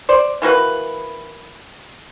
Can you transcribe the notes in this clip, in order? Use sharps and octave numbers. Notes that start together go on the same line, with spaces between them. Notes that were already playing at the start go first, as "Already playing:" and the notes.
C5 D5
E3 A#3 F#4 B4